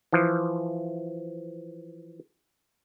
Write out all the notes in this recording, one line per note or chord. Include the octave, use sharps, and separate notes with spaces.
E3 F3